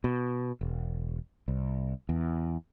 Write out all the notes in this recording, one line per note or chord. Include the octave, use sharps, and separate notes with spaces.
B2
E1
C2
E2